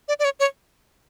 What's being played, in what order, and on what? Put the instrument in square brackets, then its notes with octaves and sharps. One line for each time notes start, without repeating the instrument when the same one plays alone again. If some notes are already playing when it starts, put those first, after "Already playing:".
[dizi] D5
D5
C#5
C#5